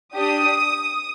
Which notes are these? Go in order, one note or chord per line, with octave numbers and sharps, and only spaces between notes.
D4 G4 D#6